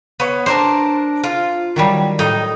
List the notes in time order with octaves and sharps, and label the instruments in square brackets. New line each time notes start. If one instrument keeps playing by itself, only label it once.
[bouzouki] B3 C#5
[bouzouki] D4 A#4 A5 [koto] C5
[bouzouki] F4
[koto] D#3 F#3 G3
[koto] A2 [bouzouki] D#4